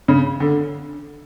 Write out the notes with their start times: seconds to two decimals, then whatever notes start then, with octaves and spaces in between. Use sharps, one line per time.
0.08 C#3
0.40 D3